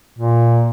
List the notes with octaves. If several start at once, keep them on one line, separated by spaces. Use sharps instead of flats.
A#2